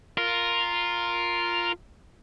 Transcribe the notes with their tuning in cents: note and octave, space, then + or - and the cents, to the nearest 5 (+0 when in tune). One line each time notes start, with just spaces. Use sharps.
F4 +0 A#4 +0